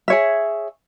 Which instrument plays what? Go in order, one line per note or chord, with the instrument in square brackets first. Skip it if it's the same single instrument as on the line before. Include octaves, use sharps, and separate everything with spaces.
[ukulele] G#4 C#5 E5